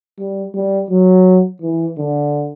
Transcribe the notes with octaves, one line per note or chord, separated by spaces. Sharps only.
G3
G3
F#3
E3
D3